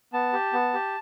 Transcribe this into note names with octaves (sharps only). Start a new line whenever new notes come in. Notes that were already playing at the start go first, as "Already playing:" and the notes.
B3 A5
G4
B3
G4